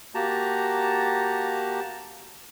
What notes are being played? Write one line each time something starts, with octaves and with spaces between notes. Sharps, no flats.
A#3 F#4 G4 A5 A#5